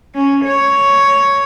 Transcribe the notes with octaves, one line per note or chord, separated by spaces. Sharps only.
C#4
C#5